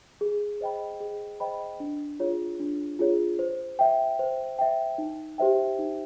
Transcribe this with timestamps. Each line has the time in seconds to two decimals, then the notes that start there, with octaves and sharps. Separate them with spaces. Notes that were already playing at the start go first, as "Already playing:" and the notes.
0.21 G#4
0.61 C5 D#5 G5 B5
1.00 G#4
1.40 C5 D#5 G5 B5
1.80 D4
2.20 F4 G#4 C#5
2.60 D4
2.99 F4 G#4 C#5
3.39 C5
3.79 E5 G5
4.19 C5
4.59 E5 G5
4.98 D#4
5.38 G4 C5 E5 G5
5.79 D#4